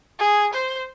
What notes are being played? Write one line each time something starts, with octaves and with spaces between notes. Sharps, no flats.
G#4
C5